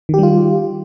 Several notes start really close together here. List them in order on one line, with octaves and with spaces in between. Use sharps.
D#3 G4 G3 F4